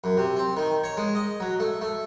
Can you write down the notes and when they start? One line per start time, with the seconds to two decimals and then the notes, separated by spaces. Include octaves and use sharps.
0.04 F#2
0.17 C3
0.37 C4
0.57 D#3
0.84 C#5
0.97 G#3
1.15 D#5
1.40 F#3
1.60 A3
1.82 A3